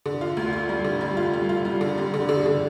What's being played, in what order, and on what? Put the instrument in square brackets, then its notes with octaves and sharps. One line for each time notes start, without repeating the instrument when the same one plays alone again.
[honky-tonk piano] D3
F4
D2
F4
G3
D3
G3
F4
G3
F4
G3
D3
G3
D3
D3
D3